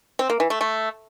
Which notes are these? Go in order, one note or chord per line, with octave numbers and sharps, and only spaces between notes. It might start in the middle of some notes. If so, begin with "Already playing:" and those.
C4
A#3
E3
A3
A3